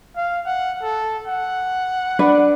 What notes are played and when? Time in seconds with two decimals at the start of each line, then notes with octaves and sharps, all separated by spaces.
0.16 F5
0.46 F#5
0.82 A4
1.27 F#5
2.19 D4 B4 D5